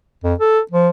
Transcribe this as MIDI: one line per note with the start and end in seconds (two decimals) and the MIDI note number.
0.24 0.34 41
0.40 0.60 69
0.71 0.89 53